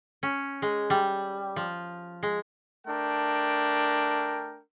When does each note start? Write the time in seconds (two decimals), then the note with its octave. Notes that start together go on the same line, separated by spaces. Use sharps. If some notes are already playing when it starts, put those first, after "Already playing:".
0.23 C#4
0.62 G#3
0.90 G3
1.56 F3
2.23 G#3
2.87 A3 D4 A#4 G5